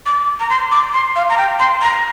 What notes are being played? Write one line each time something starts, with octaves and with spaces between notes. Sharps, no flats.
D6
A#5
C6
D6
C6
F5
A#5
G5
C6
A#5